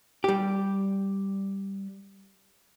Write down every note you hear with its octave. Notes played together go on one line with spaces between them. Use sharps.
G3 G4